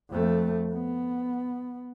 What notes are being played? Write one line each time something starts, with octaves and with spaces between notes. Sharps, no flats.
F2 A3
B3